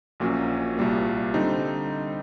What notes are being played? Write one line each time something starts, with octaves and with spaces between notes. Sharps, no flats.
A#1 A#2 F#3 A#3 C#4
C2 A#2 G3 A#3
D3 G3 C4 D#4